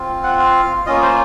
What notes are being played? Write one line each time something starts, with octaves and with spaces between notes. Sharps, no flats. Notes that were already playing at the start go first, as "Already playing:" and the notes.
Already playing: C4 F4
F#5
F5
A#3 C#4 F4 D#5
C5